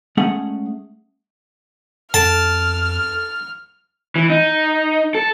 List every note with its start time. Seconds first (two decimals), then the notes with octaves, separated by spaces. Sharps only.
0.17 G#3 A3 C#4 G#4 F#5
2.14 F2 A4 A5 F6 D7
4.16 E3
4.30 D#4
5.15 A4